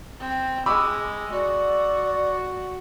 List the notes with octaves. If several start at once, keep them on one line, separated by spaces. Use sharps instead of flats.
C4
G#3 B5 D6 E6
F#4 D5